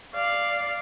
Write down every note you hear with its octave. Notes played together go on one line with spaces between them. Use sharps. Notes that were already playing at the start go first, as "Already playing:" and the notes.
D5 F5